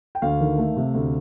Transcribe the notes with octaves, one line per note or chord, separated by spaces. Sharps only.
G5
D2 F5
D#3
A3
C3
D2